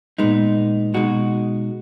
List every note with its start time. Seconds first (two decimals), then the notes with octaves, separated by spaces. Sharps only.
0.18 A#2 G#3 B3 D#4
0.94 B2 G#3 D#4 F#4